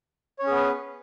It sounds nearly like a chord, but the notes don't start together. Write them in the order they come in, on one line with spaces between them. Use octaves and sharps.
C#5 C#4 G#4 B3 B4